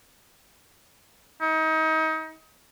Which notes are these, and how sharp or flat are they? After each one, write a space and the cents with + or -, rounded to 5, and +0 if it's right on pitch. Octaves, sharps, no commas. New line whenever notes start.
D#4 +30